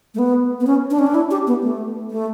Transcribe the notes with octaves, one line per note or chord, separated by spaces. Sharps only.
A3
B3
B3
C#4
D4
C#4
D4
E4
G4
B3
A3
A3